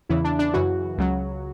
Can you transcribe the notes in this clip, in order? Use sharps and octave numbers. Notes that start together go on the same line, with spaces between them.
E2 C#3 E3 E4
D4
D4
F#2 C#3 E3 F#4
C#2 C#3 F#3